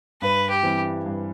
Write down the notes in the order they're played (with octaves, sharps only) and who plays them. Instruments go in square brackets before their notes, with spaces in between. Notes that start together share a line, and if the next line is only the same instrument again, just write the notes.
[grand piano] G2 [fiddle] B4
[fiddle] G4
[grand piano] E3 G3 C4
G2